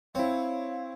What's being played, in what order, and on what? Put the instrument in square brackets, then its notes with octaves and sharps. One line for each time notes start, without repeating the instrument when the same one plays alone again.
[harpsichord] C4 [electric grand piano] E4 C#5 [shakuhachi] F5